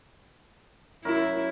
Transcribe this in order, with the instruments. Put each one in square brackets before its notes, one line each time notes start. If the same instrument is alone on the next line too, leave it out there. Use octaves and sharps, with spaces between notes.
[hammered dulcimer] F#2 A#4 [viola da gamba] E4